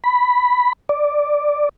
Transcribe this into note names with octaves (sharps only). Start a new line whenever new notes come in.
B5
D5